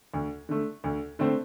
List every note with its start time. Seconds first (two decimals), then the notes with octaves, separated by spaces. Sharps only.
0.14 D2
0.49 D3 A3
0.84 D2
1.19 D3 A3 C4